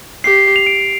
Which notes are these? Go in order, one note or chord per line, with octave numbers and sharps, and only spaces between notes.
G4 C7
F7
D7